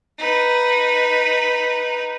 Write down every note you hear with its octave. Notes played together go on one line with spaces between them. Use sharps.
D#4 B4